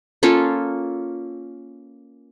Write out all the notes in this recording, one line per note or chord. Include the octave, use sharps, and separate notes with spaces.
A#3 C#4 F4 A4